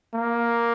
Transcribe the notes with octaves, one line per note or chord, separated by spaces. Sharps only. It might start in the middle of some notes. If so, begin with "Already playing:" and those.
A#3